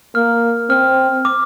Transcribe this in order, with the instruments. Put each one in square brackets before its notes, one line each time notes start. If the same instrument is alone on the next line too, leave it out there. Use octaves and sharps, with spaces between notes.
[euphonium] A#3 [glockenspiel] F6
[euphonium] C4 [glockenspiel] F6
[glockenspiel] D6